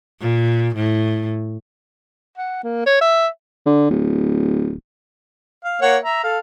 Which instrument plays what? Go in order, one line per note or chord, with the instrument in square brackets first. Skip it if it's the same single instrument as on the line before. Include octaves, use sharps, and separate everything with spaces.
[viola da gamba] A#2
A2
[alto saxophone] F#5
A#3
C#5
E5
[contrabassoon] D3
D1
[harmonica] F5
A#3 C#5 F#5
E5 A#5
A4 F5